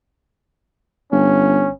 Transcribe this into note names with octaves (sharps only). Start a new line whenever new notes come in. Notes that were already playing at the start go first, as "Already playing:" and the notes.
G1 C#4